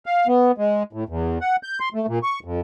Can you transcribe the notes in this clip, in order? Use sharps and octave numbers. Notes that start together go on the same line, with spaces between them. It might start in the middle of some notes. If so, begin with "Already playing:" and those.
F5
B3
G#3
A2
E2
F#5
G6
C6
A3
A#2
C#6
F2